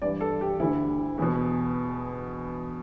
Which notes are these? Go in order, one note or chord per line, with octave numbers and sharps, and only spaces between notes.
G2 E3 D5
A4
G4
D2 D3 E4
E2 B2